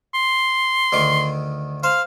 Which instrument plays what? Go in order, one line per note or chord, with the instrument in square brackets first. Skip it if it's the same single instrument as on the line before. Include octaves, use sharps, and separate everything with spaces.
[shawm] C6
[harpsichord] D2 D#3 D6
[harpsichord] C5 [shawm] F5